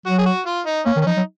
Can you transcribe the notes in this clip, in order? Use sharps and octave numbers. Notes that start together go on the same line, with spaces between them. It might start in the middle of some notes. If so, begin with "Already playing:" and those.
F#3 F#4
G#4
F#4
F4
D#4
A#3 C#4
D#3
C#4
F3 D#4
F#3